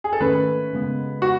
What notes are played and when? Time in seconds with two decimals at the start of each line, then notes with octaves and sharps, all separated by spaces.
0.04 G#4
0.13 A4
0.21 G#2 D#3 A3 C#4 B4
0.73 F#2 C#3 G#3 B3
1.22 F#4